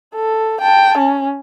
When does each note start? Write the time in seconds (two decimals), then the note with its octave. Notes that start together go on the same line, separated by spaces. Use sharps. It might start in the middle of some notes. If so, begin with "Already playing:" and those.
0.15 A4
0.61 G5 A5
0.98 C#4